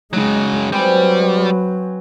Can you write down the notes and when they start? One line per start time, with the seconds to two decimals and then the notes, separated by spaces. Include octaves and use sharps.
0.13 C#3 F#3 G#3 D#4
0.72 F#3 G3 C4 B4 G#5